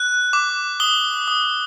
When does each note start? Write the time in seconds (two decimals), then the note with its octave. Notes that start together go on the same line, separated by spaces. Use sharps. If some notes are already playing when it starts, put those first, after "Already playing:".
Already playing: F#6
0.33 D6
0.80 D#6 G7
1.28 D#6